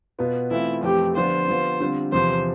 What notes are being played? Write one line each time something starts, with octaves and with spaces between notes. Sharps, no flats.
B2 B3 F4
E3 A3 C4 E4 F4
F2 E3 A3 C4 G4
D3 F3 B3 D4 F4 C5
D3 F3 B3 F4
D3 G3 C4 F4
E2 C3 F3 C5